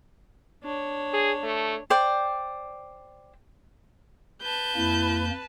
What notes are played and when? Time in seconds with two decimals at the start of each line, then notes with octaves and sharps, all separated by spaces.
0.64 D4 C#5
1.13 G#4
1.43 A3
1.90 C5 D5 G5
4.42 B4 A5 G6
4.76 F2 A#3 E4